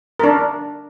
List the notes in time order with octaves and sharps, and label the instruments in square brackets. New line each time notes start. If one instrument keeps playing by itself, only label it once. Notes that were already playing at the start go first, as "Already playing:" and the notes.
[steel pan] D4 A#4